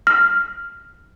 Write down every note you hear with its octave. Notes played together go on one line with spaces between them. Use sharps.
F6